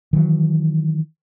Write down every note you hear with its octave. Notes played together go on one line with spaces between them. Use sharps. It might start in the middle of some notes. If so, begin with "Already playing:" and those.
D#3 E3 F#3